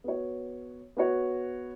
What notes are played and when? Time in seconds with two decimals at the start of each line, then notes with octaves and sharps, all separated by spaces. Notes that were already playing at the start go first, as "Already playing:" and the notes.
0.04 B3 F#4 C#5
0.97 B3 F#4 C#5